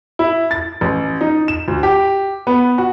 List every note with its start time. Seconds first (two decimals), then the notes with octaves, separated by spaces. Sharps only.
0.19 E4
0.51 A6
0.81 A1
1.21 D#4
1.48 E7
1.68 D2
1.83 G4
2.47 B3
2.78 F#4